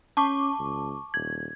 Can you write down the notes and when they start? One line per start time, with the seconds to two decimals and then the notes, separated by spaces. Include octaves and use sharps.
0.17 C#4 A5 C#6 D6
0.59 C#2
1.14 D#1 G#6